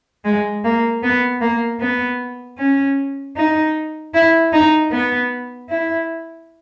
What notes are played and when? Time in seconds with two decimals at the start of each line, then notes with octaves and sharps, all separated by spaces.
0.24 G#3
0.64 A#3
1.03 B3
1.41 A#3
1.80 B3
2.58 C#4
3.36 D#4
4.14 E4
4.53 D#4
4.92 B3
5.69 E4